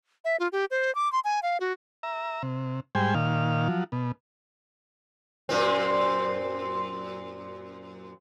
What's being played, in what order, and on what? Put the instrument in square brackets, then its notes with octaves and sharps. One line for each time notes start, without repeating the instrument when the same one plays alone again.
[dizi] E5
F4
G4
C5
D6
C6
G#5
F5
F#4
[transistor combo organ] E5 A#5
C3
G#2 G3 C5 G5 G#5
A#2 D#3 F5
F3 F#3
B2
[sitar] F#2 A#2 C4